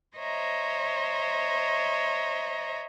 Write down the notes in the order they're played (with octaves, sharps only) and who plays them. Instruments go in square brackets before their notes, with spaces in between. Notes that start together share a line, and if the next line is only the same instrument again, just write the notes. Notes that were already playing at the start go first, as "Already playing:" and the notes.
[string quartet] C5 C#5 D#5 E5 A#5